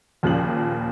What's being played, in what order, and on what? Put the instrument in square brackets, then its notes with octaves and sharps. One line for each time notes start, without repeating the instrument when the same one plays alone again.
[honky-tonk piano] D#2 A#2 C#3 F3 F#7